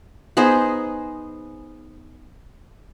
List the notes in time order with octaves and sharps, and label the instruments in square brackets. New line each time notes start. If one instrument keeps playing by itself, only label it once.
[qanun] B3 D#4 G#4 C5